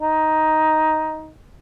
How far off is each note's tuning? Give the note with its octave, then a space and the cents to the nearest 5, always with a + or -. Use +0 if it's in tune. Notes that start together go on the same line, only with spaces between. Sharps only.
D#4 +10